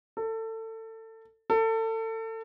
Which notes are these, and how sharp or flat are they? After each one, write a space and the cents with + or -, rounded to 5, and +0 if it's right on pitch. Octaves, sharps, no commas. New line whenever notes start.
A4 +25
A4 +30